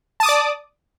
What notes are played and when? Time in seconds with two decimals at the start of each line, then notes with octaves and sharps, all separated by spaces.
0.20 A5
0.23 D#6
0.26 D6
0.29 D5